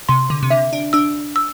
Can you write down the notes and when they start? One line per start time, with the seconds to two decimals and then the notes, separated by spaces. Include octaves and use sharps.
0.09 C3 C6
0.30 D3
0.43 C3
0.50 D3 E5
0.73 D4
0.93 D4 E6
1.36 E6